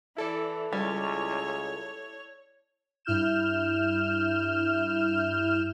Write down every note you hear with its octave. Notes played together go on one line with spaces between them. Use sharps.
E3 E4 A4 D5
C#2 G3 C#5
G2 E4 F6 G6 E7